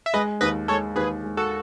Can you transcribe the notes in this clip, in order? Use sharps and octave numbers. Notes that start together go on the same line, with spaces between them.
E5
G#3 B4 D#5
D#2 B4 D#5
G#3 A4 C#5
D#2 G#4 B4
G#3
F#4 A4